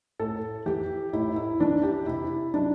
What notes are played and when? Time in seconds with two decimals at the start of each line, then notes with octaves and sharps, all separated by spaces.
0.19 A2 A4
0.66 E3 G4
1.13 A2 E4
1.36 E4
1.60 E3 D4
1.83 G4
2.06 C3 E4
2.54 F#3 D4